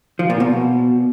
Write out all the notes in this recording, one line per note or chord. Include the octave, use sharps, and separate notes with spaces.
F3
A#2
B2